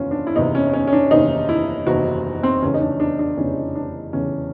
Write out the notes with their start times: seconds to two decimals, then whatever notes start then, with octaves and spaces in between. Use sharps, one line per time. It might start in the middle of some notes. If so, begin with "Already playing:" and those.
Already playing: F#1 E2 C3 D#3 C#4 F4
0.11 D4
0.27 E4
0.36 F#1 E2 C3 D#3 D#4
0.55 C#4
0.73 C#4
0.87 C#4
0.93 D4
1.11 F#1 E2 C3 D#3 D#4
1.49 E4
1.86 F#1 E2 C3 D#3 F#4
2.43 C4
2.62 F1 E2 C#3 E3 C#4
2.74 D#4
2.81 D4
3.00 D4
3.19 D4
3.37 F1 E2 C#3 E3 C#4
3.75 D4
4.13 F1 E2 C#3 E3 C#4